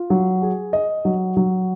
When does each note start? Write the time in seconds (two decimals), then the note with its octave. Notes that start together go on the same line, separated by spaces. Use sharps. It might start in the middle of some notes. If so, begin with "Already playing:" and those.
Already playing: F4
0.10 F#3
0.42 G#4
0.73 D#5
1.05 F#3
1.37 F#3